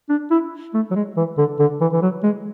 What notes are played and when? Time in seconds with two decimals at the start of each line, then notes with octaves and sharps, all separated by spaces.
0.10 D4
0.31 E4
0.74 A3
0.91 F#3
0.96 G#3
1.17 E3
1.38 D3
1.60 D3
1.81 E3
1.93 E3
2.02 F#3
2.24 G#3